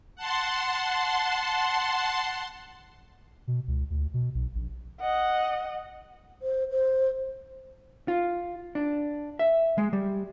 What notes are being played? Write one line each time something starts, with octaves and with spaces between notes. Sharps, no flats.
F#5 A5 C6
B2
C#2
D2
B2
B1
A#1
D#5 F#5
C5
C5
F4
D4
E5
G#3
G3